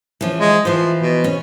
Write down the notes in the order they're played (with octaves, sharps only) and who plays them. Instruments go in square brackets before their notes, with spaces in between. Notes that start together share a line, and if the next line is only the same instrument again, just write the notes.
[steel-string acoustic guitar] E3 F3 C#4
[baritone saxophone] G#3
[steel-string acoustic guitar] E3 C5 [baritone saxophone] F3
[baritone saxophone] B2
[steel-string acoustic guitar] C#4